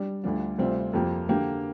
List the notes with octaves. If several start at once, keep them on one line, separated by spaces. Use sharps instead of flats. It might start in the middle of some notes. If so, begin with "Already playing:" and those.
Already playing: G3 D4 G4
D2 D3 G3 D4 F4
D2 C3 G3 C4 F4
F2 F3 A#3 G4
D3 A#3 G4